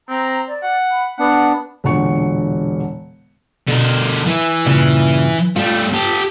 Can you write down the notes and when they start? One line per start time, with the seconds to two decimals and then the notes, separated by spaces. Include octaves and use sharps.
0.09 C4 A#5
0.49 D5
0.63 F#5
0.90 B5
1.19 B3 D4 F#5
1.84 E1 A#2 D3 F#5 C#6 C#7
3.67 B2 D3 A#4
4.26 E3
4.65 G2 A#2 C#3
5.56 G3 A3 F4
5.93 G4 A4